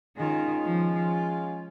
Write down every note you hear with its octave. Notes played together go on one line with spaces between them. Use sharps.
D#3 G#3 C#4 F4
F3